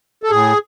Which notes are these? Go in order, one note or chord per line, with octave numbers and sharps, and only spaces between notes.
A4
A2 G#4